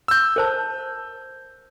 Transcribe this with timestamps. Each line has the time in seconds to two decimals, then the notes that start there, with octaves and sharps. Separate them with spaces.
0.08 E6 G6
0.36 A#4 C5 A5